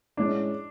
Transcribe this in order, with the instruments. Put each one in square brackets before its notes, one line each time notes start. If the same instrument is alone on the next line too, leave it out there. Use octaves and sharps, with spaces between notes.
[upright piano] A2 G#3 C#4 [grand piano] D4